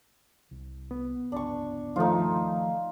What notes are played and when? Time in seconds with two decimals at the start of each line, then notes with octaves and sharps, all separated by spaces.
0.51 C2
0.91 B3
1.32 G1 C#2 D4 C#6
1.96 D#3 F3 A3 D#4 F4